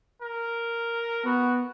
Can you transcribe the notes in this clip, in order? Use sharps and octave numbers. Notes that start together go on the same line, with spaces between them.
A#4
B3 F#4